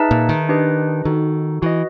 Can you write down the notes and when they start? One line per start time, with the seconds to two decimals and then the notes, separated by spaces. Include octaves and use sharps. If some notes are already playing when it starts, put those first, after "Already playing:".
Already playing: D#4 G#4 B4 E5 A5
0.11 A#2
0.29 D#3
0.49 D4 G4 B4 D#5
1.05 D#3 D#4 F#4 A4
1.62 E3 F#4 B4 D#5